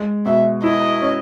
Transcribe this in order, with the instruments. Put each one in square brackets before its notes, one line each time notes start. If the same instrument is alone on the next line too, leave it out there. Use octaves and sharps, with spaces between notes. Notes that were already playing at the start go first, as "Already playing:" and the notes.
Already playing: [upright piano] G#3
[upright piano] B2 [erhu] E5
[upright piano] E4 [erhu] D#5
[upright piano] C#4